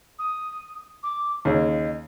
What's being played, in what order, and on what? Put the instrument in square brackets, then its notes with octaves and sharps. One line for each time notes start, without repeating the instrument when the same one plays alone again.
[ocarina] D#6
D6
[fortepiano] D#2 C#3 [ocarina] D#5